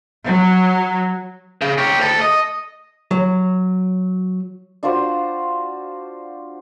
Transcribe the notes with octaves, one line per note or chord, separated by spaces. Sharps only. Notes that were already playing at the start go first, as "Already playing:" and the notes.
F#3
C#3
G4 C#5
D2 A4
D#5
F#3
D4 F4 F#4 C5